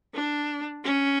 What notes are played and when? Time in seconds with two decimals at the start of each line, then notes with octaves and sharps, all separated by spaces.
0.15 D4
0.84 C#4